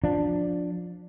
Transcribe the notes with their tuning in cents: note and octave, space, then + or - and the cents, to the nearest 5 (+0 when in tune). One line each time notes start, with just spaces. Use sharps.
F3 +20 D4 +0